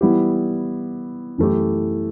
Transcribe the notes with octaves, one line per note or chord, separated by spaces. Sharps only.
E3 G3 B3 E4 G4
F#2 E3 A3 E4 G4